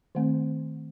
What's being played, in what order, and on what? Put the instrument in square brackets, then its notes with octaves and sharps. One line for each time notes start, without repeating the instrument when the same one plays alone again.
[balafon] D#3 A3 C4